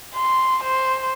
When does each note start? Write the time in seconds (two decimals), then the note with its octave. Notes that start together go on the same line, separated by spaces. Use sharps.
0.15 C6
0.64 C5